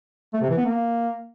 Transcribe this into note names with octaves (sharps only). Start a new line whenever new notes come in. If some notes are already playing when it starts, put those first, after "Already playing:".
A3
C3
E3
B3
A#3